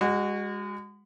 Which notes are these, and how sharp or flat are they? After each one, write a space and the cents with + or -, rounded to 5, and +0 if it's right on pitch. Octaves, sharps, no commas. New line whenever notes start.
G#3 -30 F#4 +0